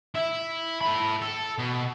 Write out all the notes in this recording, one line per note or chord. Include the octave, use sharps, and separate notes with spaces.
E4 E5
A4 B5
A4
B2